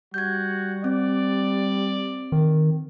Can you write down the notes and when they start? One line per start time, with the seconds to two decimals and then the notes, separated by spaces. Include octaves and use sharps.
0.14 G3 F#4 G6 G#6
0.84 C4 D5
2.32 D#3